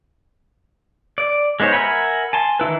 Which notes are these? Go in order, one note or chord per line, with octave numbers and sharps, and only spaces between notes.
D5
G#3 B3 D#4 C5 C#5
A#4 E5 F#5 G#5 B5
G#5 A5 C6
D#3 E3 E4 B4